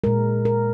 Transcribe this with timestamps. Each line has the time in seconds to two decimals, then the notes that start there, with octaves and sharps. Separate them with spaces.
0.04 A#2 G#3 A#4
0.45 A#4